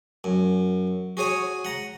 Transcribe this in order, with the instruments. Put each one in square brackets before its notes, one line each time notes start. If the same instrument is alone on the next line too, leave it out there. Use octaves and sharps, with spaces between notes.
[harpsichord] F#2
F#4 G#4 C#5 G#5
F#5 A#5